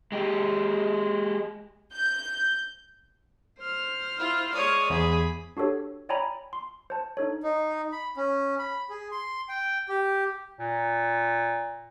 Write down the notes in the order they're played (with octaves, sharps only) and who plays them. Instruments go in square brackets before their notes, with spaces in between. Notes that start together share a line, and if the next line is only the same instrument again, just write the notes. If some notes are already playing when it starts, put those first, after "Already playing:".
[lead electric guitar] G#3 G4
[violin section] G6
[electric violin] C5 F6
[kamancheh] E4 F4
[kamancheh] G#3 D5 [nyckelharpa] C#5 D#6
[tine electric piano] E2 [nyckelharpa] G#4 [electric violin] B5
[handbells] D4 F#4 G4 A4 C#5
C#5 D5 G5 G#5 A#5 B5
C6
C5 A5
D4 D#4 A4 C#5
[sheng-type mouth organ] D#4
B5
C#4
B5
G#4
C6
G5
G4
[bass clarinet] A#2